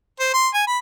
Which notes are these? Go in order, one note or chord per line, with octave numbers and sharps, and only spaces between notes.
C5
C6
G#5
B5